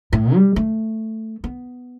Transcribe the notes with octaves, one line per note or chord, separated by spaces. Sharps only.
A2
G3
A3
B3